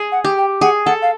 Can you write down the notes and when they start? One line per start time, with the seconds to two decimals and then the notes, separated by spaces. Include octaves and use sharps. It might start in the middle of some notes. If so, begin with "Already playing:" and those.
Already playing: G#4
0.12 F#5
0.24 G4
0.37 G5
0.61 G#4 F#5
0.86 A4 F#5
1.02 F5